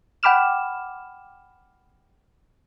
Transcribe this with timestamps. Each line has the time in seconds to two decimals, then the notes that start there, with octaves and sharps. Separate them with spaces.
0.23 F#5 G5 B5 D6 F6 E7